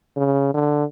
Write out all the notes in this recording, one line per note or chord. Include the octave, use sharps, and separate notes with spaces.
C#3
D3